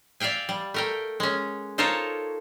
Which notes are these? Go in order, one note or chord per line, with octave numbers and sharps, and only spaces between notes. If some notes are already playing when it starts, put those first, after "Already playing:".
D5 E5 F5 G5 G#5
G3
A3 A#4 G5
G#3 C#4
D#4 F4 A4 A#4 C5 C#5